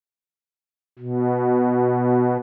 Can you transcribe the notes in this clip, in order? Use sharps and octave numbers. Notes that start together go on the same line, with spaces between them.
B2